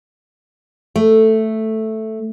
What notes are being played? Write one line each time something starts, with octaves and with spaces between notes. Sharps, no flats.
A3